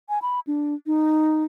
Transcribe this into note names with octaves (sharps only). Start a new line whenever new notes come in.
G#5
B5
D4
D#4